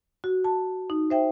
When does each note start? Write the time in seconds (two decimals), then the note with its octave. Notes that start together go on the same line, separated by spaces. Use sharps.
0.24 F#4
0.44 A5
0.90 D#4
1.10 C5 E5 G5